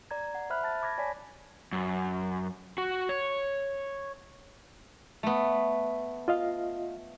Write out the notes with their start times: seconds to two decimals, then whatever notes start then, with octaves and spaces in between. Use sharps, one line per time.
0.11 D5 A#5 G#6
0.35 F#5
0.50 C5 E5 B5 F6 F#6
0.63 A5 A6
0.82 B5 D6 G#6 A#6
0.98 C#5 D5 G#5 A5 B6
1.72 F#2
2.78 F#4
3.09 C#5
5.23 A3 B3
6.28 F4 D#5 F5